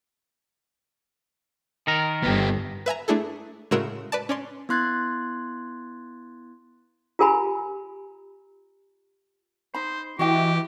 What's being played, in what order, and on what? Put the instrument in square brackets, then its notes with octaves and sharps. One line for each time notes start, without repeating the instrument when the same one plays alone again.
[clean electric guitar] D#3 A#4
[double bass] G1 [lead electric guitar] B3 G4
[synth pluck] B4 E5 G#5 A#5
A3 D4 E4 G#4 A4
A2 C#3 G#3 F#4 A#4 E6
B4 D5 A5
C#4 D5 C6
[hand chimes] B3 E4 C6 F#6 G#6 A6
[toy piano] F4 G4 A#4 G#5 A#5 B5
[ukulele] D#4 B5 [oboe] C5
[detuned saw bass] E3 [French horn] E4 [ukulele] F#4 D#5 G5 [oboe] G4